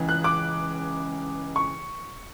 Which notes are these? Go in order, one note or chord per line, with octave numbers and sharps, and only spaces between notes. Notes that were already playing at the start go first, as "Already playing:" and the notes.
Already playing: C#2 C#3 E3
F#6
D6
C#6